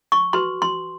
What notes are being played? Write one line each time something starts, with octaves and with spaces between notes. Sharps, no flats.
C#6
F#4 B4 C6
C6